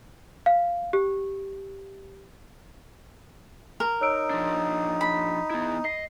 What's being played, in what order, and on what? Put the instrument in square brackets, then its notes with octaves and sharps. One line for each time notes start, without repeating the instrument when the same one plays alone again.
[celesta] F5
G4
[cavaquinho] A#4
[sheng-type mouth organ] D#4 [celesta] C#5 E6 D7
[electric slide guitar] F3 D4
[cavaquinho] B5
[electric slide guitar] B3 E4
[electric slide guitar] D#5 [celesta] C7